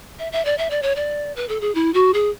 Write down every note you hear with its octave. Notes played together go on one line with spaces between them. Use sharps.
E5
E5
D5
E5
D5
C#5
D5
B4
A4
G#4
E4
F#4
G#4